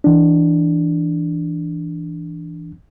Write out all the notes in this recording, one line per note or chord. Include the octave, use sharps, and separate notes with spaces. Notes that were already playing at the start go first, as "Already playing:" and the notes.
E3 D4